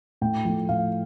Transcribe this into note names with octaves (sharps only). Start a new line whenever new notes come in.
A2 G5
F3 A3
A2 F5